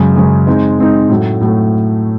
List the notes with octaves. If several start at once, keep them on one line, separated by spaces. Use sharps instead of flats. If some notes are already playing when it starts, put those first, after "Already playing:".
Already playing: F#2 C#3 G#3
F#2 C#3 G#3
G#3 C4 D#4
G#3 C4 D#4
A2 F#3 A3
A2 F#3 A3